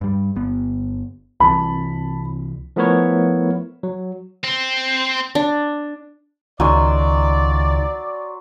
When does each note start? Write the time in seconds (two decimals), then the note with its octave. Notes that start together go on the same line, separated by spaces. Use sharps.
0.01 G2 G3
0.36 G1 B3
1.40 C2 C3 E3 A5 B5
2.76 F3 A3 B3 E4 A#4 C#5
3.83 F#3
4.44 C4
5.35 D4
6.60 C#2 D#3 F#3 D5 G#5 C6